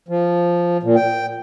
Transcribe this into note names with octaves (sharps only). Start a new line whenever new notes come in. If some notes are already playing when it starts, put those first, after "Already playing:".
F3
A#2
G5